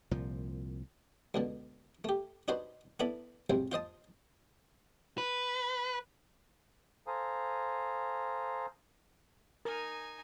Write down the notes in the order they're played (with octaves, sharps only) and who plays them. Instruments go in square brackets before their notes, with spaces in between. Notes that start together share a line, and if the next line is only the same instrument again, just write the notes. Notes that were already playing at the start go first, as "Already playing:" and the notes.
[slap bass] C2 A#2 F3
[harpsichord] C#2 B2 D3
A3 G4
D4 D#4 F#4 B4 C5
B3 D4 E4 A4 B5
C2 G#2 C3 F#3 C5
F4 C5 D#5 A5
[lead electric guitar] B4
[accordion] A4 C5 F5 G#5 A#5 D#6
[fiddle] D#4 G#5 [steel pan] A#4